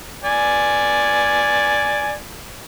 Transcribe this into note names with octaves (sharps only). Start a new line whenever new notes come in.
D5 G#5